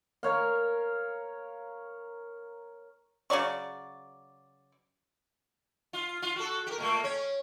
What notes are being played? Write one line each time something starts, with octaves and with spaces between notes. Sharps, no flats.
A#4 C#5 F5
C#3 F#3 D5 C#6
F4
F4
F#4 A4
G4 A#4
A#2 A3 A#3
C#4 C#5